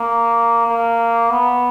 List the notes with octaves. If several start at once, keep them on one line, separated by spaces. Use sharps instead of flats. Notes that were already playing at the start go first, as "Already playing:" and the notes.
Already playing: A#3
A#3
B3